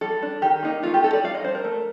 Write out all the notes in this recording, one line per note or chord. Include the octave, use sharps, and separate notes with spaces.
G3 A4
D4
D#3 G4
A#3 D#4
A3 F4
G4
D#4 A4
D5
G3 F5
D#5
D4 C5
A#4
A3